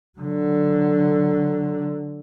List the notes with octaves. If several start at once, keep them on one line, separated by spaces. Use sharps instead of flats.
D3 F#3